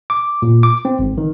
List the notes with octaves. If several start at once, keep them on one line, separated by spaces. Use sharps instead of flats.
D6
A#2
D6
C4
G#1
D#3